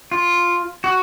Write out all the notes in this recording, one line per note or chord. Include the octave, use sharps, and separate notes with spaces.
F4
F#4